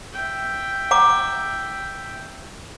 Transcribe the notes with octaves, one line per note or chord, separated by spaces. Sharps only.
E5 G5
F#5 A#5 D6